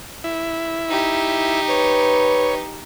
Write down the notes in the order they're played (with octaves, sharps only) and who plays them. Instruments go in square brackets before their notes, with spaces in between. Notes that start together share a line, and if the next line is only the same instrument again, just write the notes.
[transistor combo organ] E4
[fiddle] D#4 G4
[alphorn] B4 [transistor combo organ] C#5